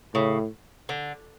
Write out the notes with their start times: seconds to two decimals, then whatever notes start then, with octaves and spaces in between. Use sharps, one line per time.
0.14 A2 C#3
0.89 D3